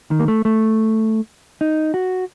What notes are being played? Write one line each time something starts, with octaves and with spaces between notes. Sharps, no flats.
D#3
A#3
A3
A3
D#4
F#4